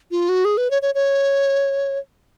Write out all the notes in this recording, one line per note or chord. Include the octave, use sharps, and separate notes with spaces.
F4
F#4
G#4
B4
C#5
C#5
C#5